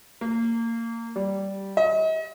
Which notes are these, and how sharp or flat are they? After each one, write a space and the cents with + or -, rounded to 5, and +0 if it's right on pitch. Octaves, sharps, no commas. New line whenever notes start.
A#3 -25
G3 -10
D#5 +40